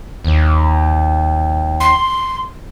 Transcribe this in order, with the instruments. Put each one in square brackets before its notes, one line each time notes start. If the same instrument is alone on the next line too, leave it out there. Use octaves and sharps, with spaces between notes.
[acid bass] D#2
[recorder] C6